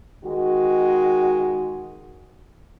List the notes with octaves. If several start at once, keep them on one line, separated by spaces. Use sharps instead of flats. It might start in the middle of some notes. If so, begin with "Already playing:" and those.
D#3 G#3 F#4